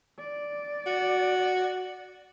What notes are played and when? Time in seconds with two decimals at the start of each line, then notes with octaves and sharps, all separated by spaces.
0.19 D5
0.86 F#4